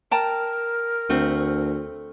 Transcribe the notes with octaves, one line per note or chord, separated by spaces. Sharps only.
A#4 G5 A5 A#5
D2 A3 C4